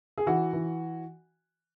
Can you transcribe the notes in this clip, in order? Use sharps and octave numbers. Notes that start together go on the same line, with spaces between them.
G#4
E3 F#4
E3